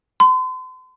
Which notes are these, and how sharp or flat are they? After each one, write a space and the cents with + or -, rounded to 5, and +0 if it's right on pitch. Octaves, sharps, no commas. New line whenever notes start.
C6 -40